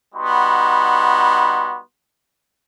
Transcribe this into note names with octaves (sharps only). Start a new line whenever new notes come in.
G3 B3 D#4 F#4 B5 C6